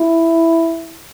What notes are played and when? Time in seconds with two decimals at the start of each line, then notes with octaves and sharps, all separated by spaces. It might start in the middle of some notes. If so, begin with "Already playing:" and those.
Already playing: E4